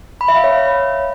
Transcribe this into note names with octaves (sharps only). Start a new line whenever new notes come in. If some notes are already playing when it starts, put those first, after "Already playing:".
B5
E5
F5
C#5